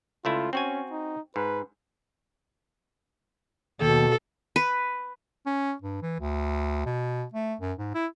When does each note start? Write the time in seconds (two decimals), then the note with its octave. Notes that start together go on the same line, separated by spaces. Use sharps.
0.25 C#2 A3 E4 F4
0.53 C4 C#4 F#4 G#5
0.91 D#4
1.36 G#2 B4
3.81 D#2 B2 A4
4.56 B4
5.46 C#4
5.82 G2
6.02 E3
6.20 D2
6.85 B2
7.34 A3
7.61 F#2
7.79 G#2
7.94 E4